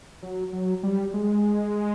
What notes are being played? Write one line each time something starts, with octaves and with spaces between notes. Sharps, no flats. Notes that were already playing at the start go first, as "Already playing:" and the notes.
F#3
F#3
G3
G#3